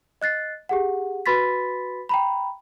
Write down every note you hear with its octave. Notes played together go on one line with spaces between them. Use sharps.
D#5 F#6 A6 C7
G4 G#4 F#5
F#4 B4 B5 C6 A6 B6
G5 A#5 B5